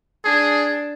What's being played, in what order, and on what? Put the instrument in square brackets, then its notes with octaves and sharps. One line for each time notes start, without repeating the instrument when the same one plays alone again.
[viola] D4 [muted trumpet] G#4